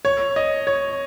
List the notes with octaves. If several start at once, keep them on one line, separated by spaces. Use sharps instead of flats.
C#5
D#5
C#5